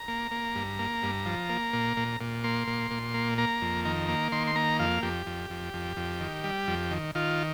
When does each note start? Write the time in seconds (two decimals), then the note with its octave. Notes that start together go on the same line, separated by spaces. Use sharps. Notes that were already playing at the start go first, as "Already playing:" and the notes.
Already playing: A#5
0.08 A#3
0.31 A#3
0.55 G2
0.79 A#3
1.03 G2
1.26 F3
1.50 A#3
1.73 A#2
1.97 A#2
2.21 A#2
2.44 A#3 C6
2.67 A#2
2.91 A#2
3.14 A#3
3.38 A#3 A#5
3.62 F2
3.85 D#3 A#5
4.08 A#3
4.32 D#3 C6
4.47 C6
4.55 A#3 A#5
4.79 F2 F5
5.03 F2 G4
5.26 F2
5.50 F2
5.74 F2
5.97 F2
6.20 D#3
6.44 G3
6.68 F2
6.91 D#3
7.15 D#3 F4